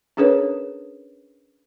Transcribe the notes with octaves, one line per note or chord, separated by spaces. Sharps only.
C#4 D4 G#4 A#4 B4 C#5